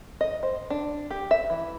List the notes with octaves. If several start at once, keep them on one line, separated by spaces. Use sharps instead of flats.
D#5
C5
D4
G4
E5
E3